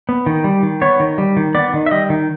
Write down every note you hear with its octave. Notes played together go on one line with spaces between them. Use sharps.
B3
D#3
G3
D#3
B3 C#5
D#3
G3
D#3
B3 D5
D#3
E5
G3 D#5
D#3